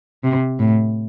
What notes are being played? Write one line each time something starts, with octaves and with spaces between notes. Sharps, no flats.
C3
A2